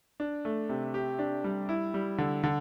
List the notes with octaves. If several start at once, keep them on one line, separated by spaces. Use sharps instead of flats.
D4
A3
C3
G4
D4
G3
E4
G3
D3
D3